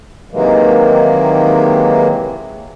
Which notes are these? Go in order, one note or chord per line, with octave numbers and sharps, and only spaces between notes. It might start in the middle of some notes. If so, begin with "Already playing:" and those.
C3 D#3 E3 F#3 G#3 A#3